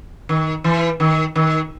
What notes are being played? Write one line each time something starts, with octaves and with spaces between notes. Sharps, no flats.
D#3
E3
D#3
D#3